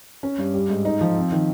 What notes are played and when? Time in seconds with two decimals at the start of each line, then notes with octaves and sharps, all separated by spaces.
0.23 C#4
0.38 G2
0.54 G3
0.69 G#2
0.85 D#4
1.01 F3
1.17 C4
1.32 D#3